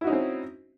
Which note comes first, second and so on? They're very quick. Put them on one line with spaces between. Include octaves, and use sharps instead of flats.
E4 F#4 D#4 C#4 C4